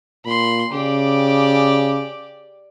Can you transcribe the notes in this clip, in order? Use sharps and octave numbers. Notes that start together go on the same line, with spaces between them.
A#2 B5 C6
C#3 G4 D5